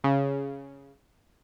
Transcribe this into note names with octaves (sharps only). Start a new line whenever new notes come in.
C#3